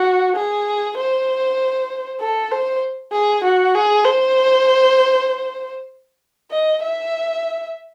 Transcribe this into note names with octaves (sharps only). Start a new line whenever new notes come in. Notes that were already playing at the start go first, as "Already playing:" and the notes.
Already playing: F#4
G#4
C5
A4
C5
G#4
F#4
G#4
C5
D#5
E5